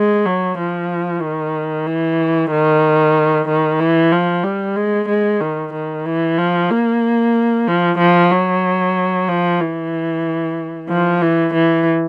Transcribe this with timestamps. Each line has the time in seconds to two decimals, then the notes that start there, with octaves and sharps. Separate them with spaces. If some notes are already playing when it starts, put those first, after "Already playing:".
Already playing: G#3
0.25 F#3
0.58 F3
1.21 D#3
1.87 E3
2.51 D#3
3.48 D#3
3.80 E3
4.12 F3
4.44 G3
4.76 G#3
5.09 G#3
5.40 D#3
5.73 D#3
6.06 E3
6.38 F3
6.70 A#3
7.67 F3
7.98 F3
8.31 F#3
9.29 F3
9.61 E3
10.89 F3
11.22 E3
11.54 E3